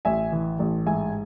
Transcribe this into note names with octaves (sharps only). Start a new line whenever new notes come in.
A1 E5 G#5
E3
A1
G#2 E5 G#5